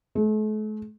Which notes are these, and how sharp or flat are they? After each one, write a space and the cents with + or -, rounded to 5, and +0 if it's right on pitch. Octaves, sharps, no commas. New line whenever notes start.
A3 -45